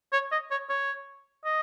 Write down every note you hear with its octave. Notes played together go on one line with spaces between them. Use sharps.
C#5
D#5
C#5
C#5
D#5